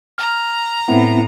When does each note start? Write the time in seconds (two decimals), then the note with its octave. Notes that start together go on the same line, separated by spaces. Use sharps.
0.18 A#5 F6
0.88 A2 B3 C4 E4